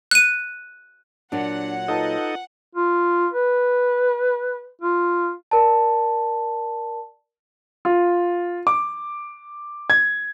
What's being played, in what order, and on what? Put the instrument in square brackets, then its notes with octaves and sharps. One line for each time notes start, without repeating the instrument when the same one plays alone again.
[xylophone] F#6 D#7
[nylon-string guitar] A#2 F#3 [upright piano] D4 [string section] F#5
[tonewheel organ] D#4 A4 D#5 [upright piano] F4 B4 A5
[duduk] F4
B4
F4
[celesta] A#4 D5 A5
[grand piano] F4
D6
G#6